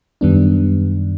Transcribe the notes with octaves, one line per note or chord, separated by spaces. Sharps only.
F#2 D#3 G3 B3 D4